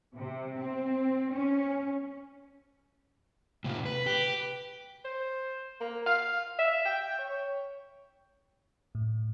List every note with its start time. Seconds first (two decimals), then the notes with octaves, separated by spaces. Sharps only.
0.15 C3
0.60 C4
1.32 C#4
3.64 A2 C3 F4
3.86 B4
4.06 G4
5.05 C5
5.81 A#3
6.06 F5
6.59 E5
6.85 G5
7.19 C#5
8.95 A2